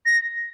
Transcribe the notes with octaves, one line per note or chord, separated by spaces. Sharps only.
A#6